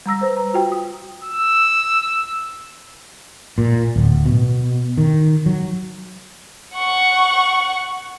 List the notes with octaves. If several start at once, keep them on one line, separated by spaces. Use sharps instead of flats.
G3 A#5 E6 A#6
B4 C5
A#5
F4 F#4 G5
D#6
E6
A#2
D1
B2
D#3
F#3
F#5 C#6